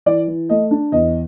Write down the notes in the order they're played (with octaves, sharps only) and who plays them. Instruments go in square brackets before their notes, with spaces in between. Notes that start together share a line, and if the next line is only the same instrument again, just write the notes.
[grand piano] E3 D5
E3
A3 D#5
D4
E2 D#5